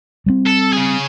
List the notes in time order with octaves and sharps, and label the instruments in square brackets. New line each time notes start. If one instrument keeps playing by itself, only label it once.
[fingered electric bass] G3 A3 C4
[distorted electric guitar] A4
C#3 G#4